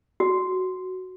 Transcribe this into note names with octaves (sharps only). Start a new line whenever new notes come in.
F#4